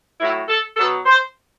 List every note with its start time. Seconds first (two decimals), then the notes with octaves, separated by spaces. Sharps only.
0.20 A2 F#3 E4
0.49 A4
0.77 F#3 A4
0.81 B2
1.06 C5